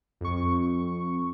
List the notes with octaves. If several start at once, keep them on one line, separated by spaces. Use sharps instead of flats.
F2 C#6